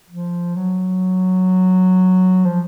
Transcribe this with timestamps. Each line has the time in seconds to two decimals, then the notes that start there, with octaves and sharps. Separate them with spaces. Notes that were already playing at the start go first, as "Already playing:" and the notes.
0.09 F3
0.55 F#3
2.45 F3